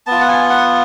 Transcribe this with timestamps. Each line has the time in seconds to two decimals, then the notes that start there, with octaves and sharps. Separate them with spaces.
0.06 B3 F4 A5
0.21 F#5
0.28 G#5
0.50 F#5